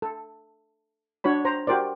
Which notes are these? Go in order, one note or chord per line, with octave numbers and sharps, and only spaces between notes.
A4
D4 F#4 C#5 B5
C5 A#5
F#4 G4 A#4 C5 D5